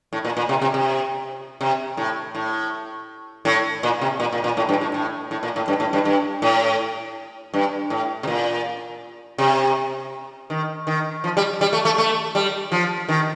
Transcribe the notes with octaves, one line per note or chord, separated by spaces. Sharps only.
A2
A#2
A#2
C3
C3
C3
C3
A2
A2
A2
A#2
C3
A#2
A#2
A#2
A2
G2
A2
A2
A2
A#2
A2
G2
A2
G2
G2
A2
G2
A2
C3
A#2
C3
D#3
D#3
F3
G3
G3
A3
A3
A3
G3
F3
D#3